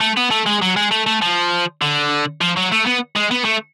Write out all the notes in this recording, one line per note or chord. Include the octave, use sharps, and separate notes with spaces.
A3
B3
A3
G#3
F#3
G#3
A3
A3
F3
D3
F3
F#3
A3
B3
G#3
B3
A3